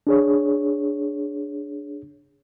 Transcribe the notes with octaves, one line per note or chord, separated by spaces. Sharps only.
D4 G#4 C#5